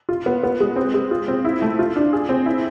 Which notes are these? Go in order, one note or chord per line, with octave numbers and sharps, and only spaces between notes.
F4
B3
B3
G#3
C4
G#3
F4
C4
E4
A3
F4
D4
G#4
C4
E4